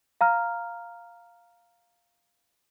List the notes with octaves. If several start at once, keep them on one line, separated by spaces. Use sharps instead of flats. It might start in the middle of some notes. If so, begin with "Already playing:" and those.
F5 A#5 F6